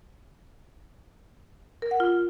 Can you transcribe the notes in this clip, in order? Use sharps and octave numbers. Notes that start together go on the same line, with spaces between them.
A#4
F#5
F4